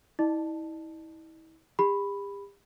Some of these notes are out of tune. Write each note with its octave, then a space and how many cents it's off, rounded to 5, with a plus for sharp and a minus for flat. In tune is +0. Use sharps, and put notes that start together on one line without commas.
E4 -40 D5 +45 A5 +0
G4 +40 B5 +0